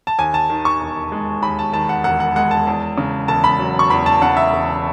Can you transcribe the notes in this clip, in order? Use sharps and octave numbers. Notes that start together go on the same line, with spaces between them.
A5
D#2 G#5
A5
D#3
C#6
E1
G#3
D#2 B5
A5
D#3 A5
F#5
E1 F#5
F#5
G#3 F#5
A5
E2
C#3
E1 A5
B5
F#3
C#6
E2 B5
A5
C#3 F#5
E5
E1